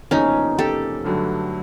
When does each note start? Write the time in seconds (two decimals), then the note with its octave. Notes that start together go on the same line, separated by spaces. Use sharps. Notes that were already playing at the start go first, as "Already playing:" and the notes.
0.11 F1 E2 C#3 F3 A#3 C#4 D#4
0.59 G4 A4
1.04 G2 D3 F#3 A3